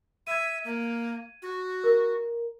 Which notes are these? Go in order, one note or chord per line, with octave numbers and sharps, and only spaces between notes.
E5 G#6 D#7
A#3
F#4
A#4